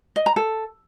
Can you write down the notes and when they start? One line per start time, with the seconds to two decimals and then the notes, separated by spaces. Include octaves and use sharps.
0.16 D#5
0.26 A#5
0.36 A4